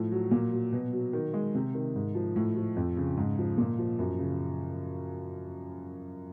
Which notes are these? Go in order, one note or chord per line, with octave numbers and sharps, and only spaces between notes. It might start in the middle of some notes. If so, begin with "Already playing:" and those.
Already playing: A2 F3
F#3
A#2
F#3
B2
F#3
D#3
G#3
C3
D#3
G#2
F3
A2
F3
F2
C#3
G#2
F3
A#2
F3
F#2
C#3